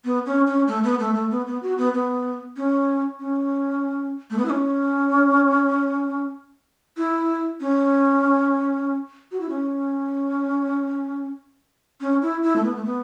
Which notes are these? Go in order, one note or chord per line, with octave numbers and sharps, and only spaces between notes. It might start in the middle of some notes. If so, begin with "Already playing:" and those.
B3
C#4
C#4
A3
B3
A3
A3
B3
B3
F#4
B3
B3
C#4
C#4
A3
B3
E4
C#4
E4
C#4
F#4
E4
C#4
C#4
E4
E4
A3
B3
A3
B3